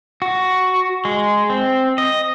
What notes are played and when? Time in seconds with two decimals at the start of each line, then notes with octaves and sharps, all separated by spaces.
0.22 F#4
1.05 G#3
1.50 C4
1.98 D#5